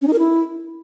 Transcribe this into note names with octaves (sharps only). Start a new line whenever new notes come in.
C#4
D#4
A#4
E4